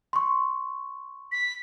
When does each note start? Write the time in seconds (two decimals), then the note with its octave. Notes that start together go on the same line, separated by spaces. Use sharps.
0.13 C6 C#6
1.32 B6